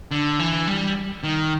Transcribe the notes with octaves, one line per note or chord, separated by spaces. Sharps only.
D3
E3
G3
D#3